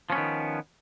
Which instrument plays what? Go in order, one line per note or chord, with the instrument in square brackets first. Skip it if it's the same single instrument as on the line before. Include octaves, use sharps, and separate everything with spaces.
[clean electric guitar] F3
C#4
B3
D#3